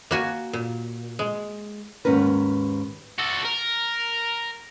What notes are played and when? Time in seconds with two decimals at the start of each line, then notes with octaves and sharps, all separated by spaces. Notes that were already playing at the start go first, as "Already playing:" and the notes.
0.11 A#3 F#4 G#5
0.53 A#2
1.19 G#3
2.05 D#2 G#2 C#4 A#4 B4
3.18 F#4 A4
3.45 A#4